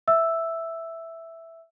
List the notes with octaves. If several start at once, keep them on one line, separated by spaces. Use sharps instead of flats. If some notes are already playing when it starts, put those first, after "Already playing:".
E5 E6